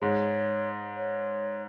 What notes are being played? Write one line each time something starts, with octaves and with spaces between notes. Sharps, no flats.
G#2 G#3 C#5
C#5